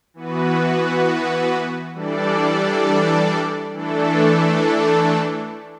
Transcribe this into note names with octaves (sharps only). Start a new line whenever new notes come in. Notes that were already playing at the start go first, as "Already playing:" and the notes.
E3 B3 F#4 B4
E3 G3 D4 A4 D5
E3 A3 D4 A4